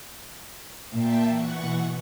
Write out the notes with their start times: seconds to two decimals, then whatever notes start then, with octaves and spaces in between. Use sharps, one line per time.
0.92 A#2 E5 G5 A5
1.27 E3 F#5 C#6
1.62 B2